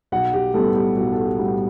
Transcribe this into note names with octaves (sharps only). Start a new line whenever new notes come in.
B1 F#5
G4
A2 G3 B3 A4
G4
B1 F#4
A4
G4
A2 G3 B3 F#4